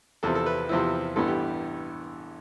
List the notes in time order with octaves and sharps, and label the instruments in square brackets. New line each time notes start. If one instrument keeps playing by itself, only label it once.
[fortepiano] E2 C3 F3 C4 E4 A4
A4
B4
E2 C3 F3 C4 E4
A1 G2 E3 B3 A4
G4